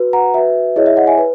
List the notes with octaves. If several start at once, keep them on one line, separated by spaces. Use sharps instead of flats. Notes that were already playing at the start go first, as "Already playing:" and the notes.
Already playing: F#4 B4
F#5 A#5
F#4 B4 E5
E4 G#4 C#5 D#5
E5
D#5 F#5
E5 G#5
B4